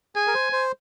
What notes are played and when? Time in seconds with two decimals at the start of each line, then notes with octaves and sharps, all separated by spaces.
0.15 G#4 G#5
0.27 A#4
0.34 C5
0.53 C5